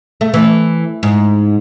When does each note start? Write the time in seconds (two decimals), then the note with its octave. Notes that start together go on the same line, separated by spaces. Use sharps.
0.21 A3
0.34 E3
1.03 G#2